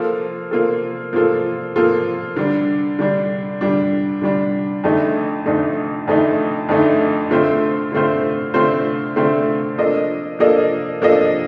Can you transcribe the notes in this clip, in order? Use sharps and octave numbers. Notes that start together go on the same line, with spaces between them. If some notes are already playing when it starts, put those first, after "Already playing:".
Already playing: F3 A#3 F4 A4
F3 A#3 F4 A4
F3 A#3 F4 A4
F3 A#3 F4 A4
D3 G3 D4
D3 G3 D4
D3 G3 D4
D3 G3 D4
F2 D3 A3 D#4
F2 D3 A3 D#4
F2 D3 A3 D#4
F2 D3 A3 D#4
D3 A3 C4 F4 C5
D3 A3 C4 F4 C5
D3 A3 C4 F4 C5
D3 A3 C4 F4 C5
F3 A#3 D4 A4 D#5
F3 A#3 D4 A4 D#5
F3 A#3 D4 A4 D#5